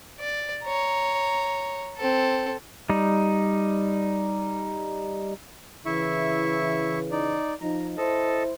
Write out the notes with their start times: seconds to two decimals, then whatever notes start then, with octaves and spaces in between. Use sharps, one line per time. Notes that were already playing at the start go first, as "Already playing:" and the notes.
0.20 D5
0.64 C#5 A#5
1.97 C4 A4
2.89 G3 D#4
5.86 C#3 E3 E4 E5 C#6
7.11 D#4 D5
7.61 F3 D#4 A#5
7.97 E4 A4 C5 D#5 A5